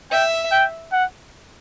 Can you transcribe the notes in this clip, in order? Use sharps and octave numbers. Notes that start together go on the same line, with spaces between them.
E5 G5
G5
F#5